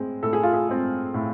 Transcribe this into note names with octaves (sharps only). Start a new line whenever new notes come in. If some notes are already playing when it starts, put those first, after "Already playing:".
Already playing: A2 G#3 C4
A2 A4
G#4
F4
G#4
G#3 C4
A2